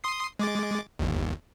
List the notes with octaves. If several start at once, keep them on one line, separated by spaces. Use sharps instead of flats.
C6 D#6 C7
G#3 D6 A6
G1 D#2